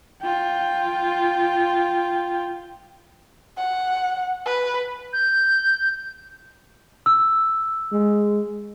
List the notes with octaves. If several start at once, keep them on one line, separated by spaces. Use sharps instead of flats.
F4 G5
F#5
B4
G6
E6
G#3